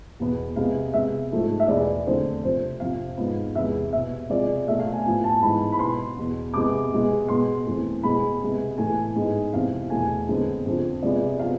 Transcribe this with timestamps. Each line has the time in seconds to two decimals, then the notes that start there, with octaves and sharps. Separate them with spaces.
0.20 E2 B2 B3
0.56 C3 G#3 B3 F5
0.94 C3 G#3 B3 E5
1.32 G#2 F3 A3
1.60 E5
1.68 E2 B2 G#3 B3 D5
2.06 F2 D3 A3 C5
2.44 F2 C3 F3 C5
2.80 F2 C3 F3 F5
3.17 G#2 F3 B3
3.55 E2 C3 G#3 B3 E5
3.93 B2 B3 E5
4.30 C3 F3 G#3 D5
4.67 B2 A3 E5
4.80 F5
4.93 G#5
5.05 A2 F3 B3 G#5
5.24 A5
5.42 G#2 E3 B3 B5
5.72 B5
5.79 B2 B3 C6
6.17 E2 B2 B3
6.54 C3 G#3 B3 D6
6.91 B2 G#3 B3
7.28 B2 G#3 B3 C6
7.66 F2 E3 A3
8.03 B2 G#3 B3 B5
8.42 C3 G#3 B3
8.78 A2 E3 A3 G#5
9.15 G#2 G#3 B3
9.53 F2 C3 E3 B3 F5
9.90 E2 B2 A3 G#5
10.28 F2 D3 G#3 B3
10.66 F2 D3 F3
11.02 C3 F3 G#3 B3 D5
11.39 C3 F3 B3 F5